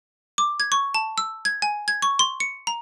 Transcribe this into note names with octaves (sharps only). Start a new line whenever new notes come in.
D6
G#6
C#6
A5
E6
G#6
G#5
G#6
C#6
C6
C#7
A#5